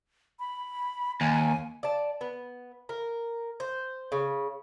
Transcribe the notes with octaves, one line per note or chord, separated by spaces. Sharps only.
B5
D#2 G#5
D5 A5
B3
A#4
C5
C#3